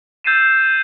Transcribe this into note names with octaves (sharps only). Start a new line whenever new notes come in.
E6 G6 A6 C7 D#7 E7